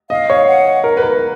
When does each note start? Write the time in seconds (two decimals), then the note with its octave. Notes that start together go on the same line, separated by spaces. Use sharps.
0.10 D#5 F5
0.30 C#5
0.47 F#5
0.84 A#4
0.97 B4
1.02 A#4